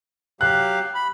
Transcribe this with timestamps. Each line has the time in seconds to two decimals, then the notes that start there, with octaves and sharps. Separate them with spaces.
0.41 F#3 G4 F5 F#6
0.94 B5